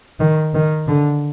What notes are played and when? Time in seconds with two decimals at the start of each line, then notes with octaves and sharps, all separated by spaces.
0.20 D#3
0.54 D#3
0.87 D3